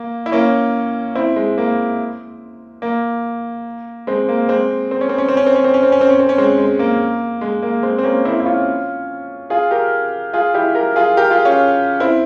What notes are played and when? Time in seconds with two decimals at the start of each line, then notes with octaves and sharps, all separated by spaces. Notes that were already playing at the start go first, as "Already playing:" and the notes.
Already playing: A#3
0.26 E4
0.32 A#3 C#4
1.15 C4 E4
1.36 G#3
1.58 A#3
2.82 A#3
4.07 G#3 C4
4.29 A#3
4.49 G#3 C4
4.91 C4
5.01 C#4
5.09 C4
5.18 C#4
5.28 C4
5.37 C#4
5.46 C4
5.56 C#4
5.64 C4
5.74 C#4
5.83 C4
5.92 C#4
6.01 C4
6.10 C#4
6.20 C4
6.29 C#4
6.38 G#3 C4
6.58 G#3
6.79 A#3
7.41 G#3
7.62 A#3
7.83 G#3 C4
7.98 C4
8.04 A#3 C#4
8.25 C4 E4
8.40 E4
8.45 C#4 F4
9.50 F4 G#4
9.71 G4 A#4
10.33 F4 G#4
10.54 E4 G4
10.75 G4 A#4
10.96 F4 G#4
11.17 G4 A#4
11.30 F4 G#4
11.45 C#4 F4
12.00 C4 E4